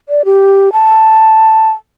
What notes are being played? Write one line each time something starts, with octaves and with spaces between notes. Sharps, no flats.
D5
G4
A5